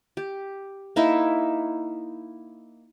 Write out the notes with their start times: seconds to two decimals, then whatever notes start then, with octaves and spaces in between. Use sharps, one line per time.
0.17 G4
0.96 A#3 D#4 E4